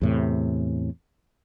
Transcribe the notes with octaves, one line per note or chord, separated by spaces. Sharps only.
E2 A2 C3